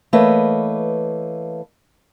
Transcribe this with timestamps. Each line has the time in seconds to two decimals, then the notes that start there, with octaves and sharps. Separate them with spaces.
0.13 E3 A3 A#3 B4 C#5 D#5